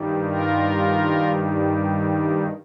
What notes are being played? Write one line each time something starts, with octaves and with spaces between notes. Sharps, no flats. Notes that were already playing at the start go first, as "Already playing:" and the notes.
Already playing: G2 D#3 G3
F4 A#4